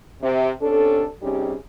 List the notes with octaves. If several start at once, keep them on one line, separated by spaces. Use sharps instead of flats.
C3
C3 C#4 D4 A4
C3 G3 C#4 D#4 G4 G#4